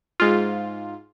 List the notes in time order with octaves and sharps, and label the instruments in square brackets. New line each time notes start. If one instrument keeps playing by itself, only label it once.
[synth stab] G#2 F4